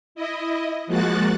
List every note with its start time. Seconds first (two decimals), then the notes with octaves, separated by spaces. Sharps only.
0.15 E4 D#5
0.87 F3 G#3 A#3 F#4 F#6 A6